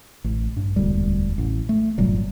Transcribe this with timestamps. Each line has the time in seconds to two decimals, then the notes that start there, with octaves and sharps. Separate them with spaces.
0.24 A1
0.56 G2
0.76 E1 D2 G3
1.38 A1
1.69 A3
1.98 G1 A#2 F#3 G3